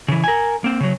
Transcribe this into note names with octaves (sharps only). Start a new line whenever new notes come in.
C#3 E3
A#4 G#5
A#3 C4
C#3 F#3